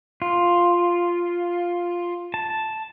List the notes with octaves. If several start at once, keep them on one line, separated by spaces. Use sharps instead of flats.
F4
A5